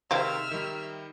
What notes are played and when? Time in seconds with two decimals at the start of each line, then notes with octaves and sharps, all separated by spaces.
0.11 C3 D#3 G#3 C4 E5 F5 E6 F6
0.51 D#3 G3